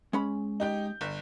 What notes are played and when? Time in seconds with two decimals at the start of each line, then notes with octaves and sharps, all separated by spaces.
0.13 G#3 C#4 B5
0.60 D#4 G4 G6
1.01 G1